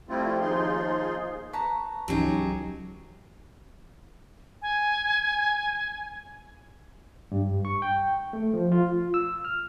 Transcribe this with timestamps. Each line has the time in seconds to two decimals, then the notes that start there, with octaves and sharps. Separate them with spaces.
0.09 F3 G3 A3 C4 E4 F4
0.40 D#2 F3 D#4 F4 G#4 C6
1.53 B4 A5 A#5 C#6
2.08 C#2 E3 F#3 C#4 D#4 G4 G#4
4.62 G#5
7.32 G2
7.65 C#6
7.82 G5
8.33 A3
8.54 F3
8.72 F4
9.14 E6
9.45 F6